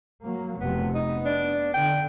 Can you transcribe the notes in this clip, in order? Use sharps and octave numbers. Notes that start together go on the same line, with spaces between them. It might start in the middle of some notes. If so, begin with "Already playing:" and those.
F#3 A#3
F1 C3 B3
B3 D#4
D4
D3 G5